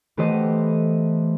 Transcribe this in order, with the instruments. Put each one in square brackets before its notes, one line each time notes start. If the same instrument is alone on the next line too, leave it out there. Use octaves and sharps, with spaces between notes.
[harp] E3 A3 B3 G4 C5 D#5